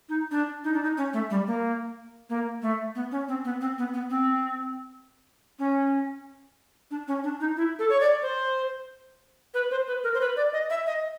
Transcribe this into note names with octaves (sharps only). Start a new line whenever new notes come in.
D#4
D4
D#4
D4
D#4
C#4
A3
G3
A#3
A#3
A3
B3
C#4
C4
B3
C4
B3
B3
C4
C#4
D4
C#4
D4
D#4
E4
A4
C#5
D5
C5
B4
C5
B4
A#4
C5
B4
D5
D#5
E5
D#5